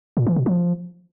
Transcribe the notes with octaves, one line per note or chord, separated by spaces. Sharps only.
A#2
E3
B2
F3